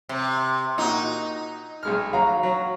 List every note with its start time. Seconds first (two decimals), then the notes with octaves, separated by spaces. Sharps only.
0.09 C3
0.78 A#2 D#4 F#4
1.83 B1 G#3 F6
2.13 F#3 F5 A#5
2.43 F#3